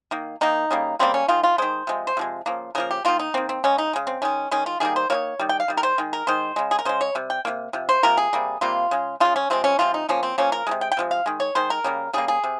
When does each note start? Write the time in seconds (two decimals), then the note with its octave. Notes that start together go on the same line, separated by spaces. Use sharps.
0.11 D#3 A#3
0.41 D#3 A#3 D#4
0.71 C#3 G3 A#3
0.99 C#3 G3 A#3 C4
1.14 C#4
1.28 D#3 G#3 F4
1.43 F4
1.58 D#3 G#3 C5
1.87 C3 F3 G#3
2.07 C5
2.17 C3 F3 G#3
2.46 C#3 F3 A#3
2.75 C#3 F3 A#3 A#4
2.91 G4
3.05 D#3 A#3 F4
3.19 D#4
3.34 D#3 A#3 C4
3.49 C4
3.64 C#3 G#3 C#4
3.78 D#4
3.93 C#3 G#3
4.07 C4
4.22 D#3 G#3 C#4
4.51 D#3 G#3 C#4
4.66 F4
4.80 D#3 G3 A#3 G#4
4.96 C5
5.10 D#3 G3 A#3 C#5
5.39 D#3 G3
5.49 G5
5.60 F5
5.68 D#3 G3
5.77 A#4
5.83 C5
5.98 D#3 G#3
6.13 A#4
6.27 D#3 G#3 C5
6.56 C#3 G#3
6.71 G#4
6.79 A#4
6.85 C#3 G#3 C5
7.01 C#5
7.15 C3 G3
7.30 G5
7.45 C3 G3 A#3
7.73 C3 F3
7.89 C5
8.03 C3 F3 A#3 A#4
8.17 G#4
8.33 C3 G3 A#3
8.61 C3 G3 A#3 F4
8.91 C#3 G#3
9.20 C#3 G#3 F4
9.36 C#4
9.50 C3 F3 G#3 C4
9.64 C#4
9.79 C3 F3 G#3 F4
9.94 D#4
10.09 C#3 F3 A#3 C#4
10.23 C4
10.38 C#3 F3 A#3 C#4
10.52 A#4
10.67 C3 F3 G#3
10.81 G5
10.92 G5
10.97 C3 F3 G#3
11.11 F5
11.26 D#3 G#3
11.40 C#5
11.55 D#3 G#3 C5
11.70 A#4
11.84 C#3 G3 A#3
12.13 C#3 G3 A#3 G#4
12.28 G#4
12.44 C3